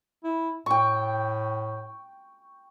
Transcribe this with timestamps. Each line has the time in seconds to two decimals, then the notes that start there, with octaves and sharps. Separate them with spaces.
0.24 E4
0.66 A2 G5 C#6